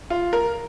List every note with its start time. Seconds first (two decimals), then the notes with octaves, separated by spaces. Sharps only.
0.10 F4
0.33 A#4